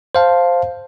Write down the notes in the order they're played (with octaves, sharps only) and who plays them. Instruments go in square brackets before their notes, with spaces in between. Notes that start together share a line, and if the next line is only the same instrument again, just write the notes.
[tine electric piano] C5 F5 A5